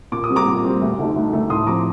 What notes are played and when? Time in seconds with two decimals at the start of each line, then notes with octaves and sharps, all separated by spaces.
0.12 A#2 D6
0.24 D#6
0.29 G3 C4
0.36 A#5 D6
0.46 A#2
0.64 G3 C4
0.81 D2
0.99 D3 A3 D#4
1.16 D2
1.33 D3 A3 D#4
1.50 A2 C6 D#6
1.67 F3 A3 C4 A#5 D6